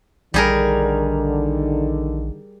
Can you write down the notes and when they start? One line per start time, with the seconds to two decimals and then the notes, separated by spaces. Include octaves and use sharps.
0.34 A#1 D3 D#3 G3 G#4 A#4